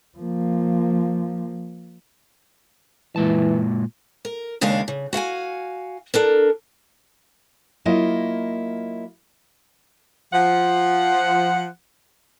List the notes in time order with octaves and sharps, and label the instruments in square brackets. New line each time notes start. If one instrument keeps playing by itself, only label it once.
[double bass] F3 A#3
[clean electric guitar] A#2 G#3 A5 [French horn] E3
[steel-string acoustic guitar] A#4
D#2 C#3 G#3 D4 A#4 F5
C#3
F#4 F5 F#5 G#5
D4 A4 A#4
F#3 A#3 E4 F4 D#5
[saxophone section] F3 F#5